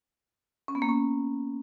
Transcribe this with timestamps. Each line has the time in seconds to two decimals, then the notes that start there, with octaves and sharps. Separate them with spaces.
0.68 C#4
0.75 B3
0.82 A#3
0.89 C#4